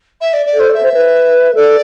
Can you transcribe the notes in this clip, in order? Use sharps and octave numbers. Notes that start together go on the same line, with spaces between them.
E5
D5
D5
A4
C5
D5
E5
C5
B4
A4 D5